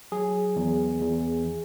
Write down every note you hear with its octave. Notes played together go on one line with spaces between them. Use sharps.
F#3 G#4
E2
E2